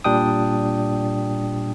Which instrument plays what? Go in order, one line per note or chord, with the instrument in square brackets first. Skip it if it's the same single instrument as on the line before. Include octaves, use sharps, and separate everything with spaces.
[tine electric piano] A#2 G3 D4 G5 D#6